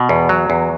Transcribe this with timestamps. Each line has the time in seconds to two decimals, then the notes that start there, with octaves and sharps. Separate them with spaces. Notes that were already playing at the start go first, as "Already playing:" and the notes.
Already playing: B2
0.09 E2
0.29 F#3
0.50 E2